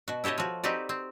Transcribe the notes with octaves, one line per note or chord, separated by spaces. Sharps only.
B2 F#4
E4 G4 A4 C#5 D#5
F3 F#4
C4 D#4 F#4 G4 B4 D5
C4